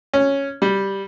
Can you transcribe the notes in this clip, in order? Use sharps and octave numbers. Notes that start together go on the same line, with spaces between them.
C#4
G3